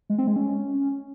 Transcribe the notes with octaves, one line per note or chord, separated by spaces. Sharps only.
G#3
C4
G#3
C#4